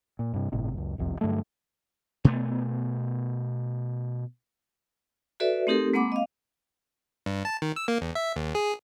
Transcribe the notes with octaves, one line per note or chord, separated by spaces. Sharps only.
A#2
G2 C3
G1 A2 C3
C#2 F#2
F#1 C2 F2 C3
G2 D3 F#3 A3
B2 A3 B3
F#4 A4 B4 D5 E5
A3 C4 D#4 G4 A4 A#4
G#3 A#3 C4 F#5 B5 D6
D#5 F5
G2
A5
D#3
E6
A#3
E2
E5
D#2
G#4